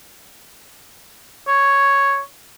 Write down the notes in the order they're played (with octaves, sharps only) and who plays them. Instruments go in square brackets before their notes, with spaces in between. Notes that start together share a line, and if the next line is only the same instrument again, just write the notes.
[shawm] C#5